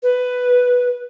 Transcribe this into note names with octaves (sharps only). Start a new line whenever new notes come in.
B4